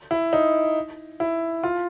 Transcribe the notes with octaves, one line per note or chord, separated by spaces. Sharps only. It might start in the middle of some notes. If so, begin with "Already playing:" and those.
E4
D#4
E4
F4